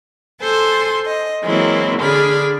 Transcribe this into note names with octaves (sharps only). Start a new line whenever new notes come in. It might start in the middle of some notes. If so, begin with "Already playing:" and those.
A4 C5 G#5 C6
D#5
E3 F#3 G#3 A#3 C4 E4
D3 D4 G#4 D5 B5 F6